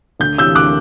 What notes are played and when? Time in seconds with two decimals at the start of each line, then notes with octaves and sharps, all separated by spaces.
0.20 D2 G6
0.38 C3 E3 E6 G6
0.55 D2 D6 F#6